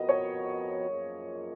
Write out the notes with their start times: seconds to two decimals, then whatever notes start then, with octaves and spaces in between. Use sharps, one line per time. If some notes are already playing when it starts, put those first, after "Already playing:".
Already playing: F2 F3 B3 F#4 A#4 D#5
0.09 C#5
0.89 F#2 F3 A#3 F4 G#4